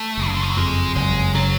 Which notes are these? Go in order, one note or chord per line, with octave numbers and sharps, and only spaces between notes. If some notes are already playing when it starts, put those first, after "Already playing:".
Already playing: A3
F#1
C#3
D3
F3
F#3
F2 G#3
F#1 G#3
C#3 F#3